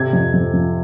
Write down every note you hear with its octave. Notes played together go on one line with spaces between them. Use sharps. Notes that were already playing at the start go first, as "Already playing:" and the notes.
Already playing: C3 G#6
F2
F2
F3